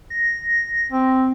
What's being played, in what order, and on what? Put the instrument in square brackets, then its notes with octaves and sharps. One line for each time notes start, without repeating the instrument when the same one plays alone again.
[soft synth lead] A#6
[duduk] C4